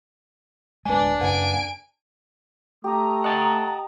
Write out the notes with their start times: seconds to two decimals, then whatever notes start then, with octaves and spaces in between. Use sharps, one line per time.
0.86 D1 G#3 D4 B4 G#5
1.21 F#2 C#3 A#3 B4 F5 F#5 G#5 D7
2.84 A3 G4 A#5 D#6
3.24 D#5 F#5 A5